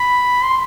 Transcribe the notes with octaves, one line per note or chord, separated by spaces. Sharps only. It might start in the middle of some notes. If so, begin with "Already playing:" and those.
Already playing: B5
C6